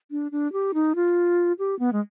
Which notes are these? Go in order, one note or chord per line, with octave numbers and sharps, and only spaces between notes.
D4
D4
G4
D#4
F4
G4
B3
G#3